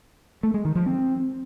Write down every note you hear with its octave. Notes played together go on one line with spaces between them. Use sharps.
A3
G#3
D#3
F3
C4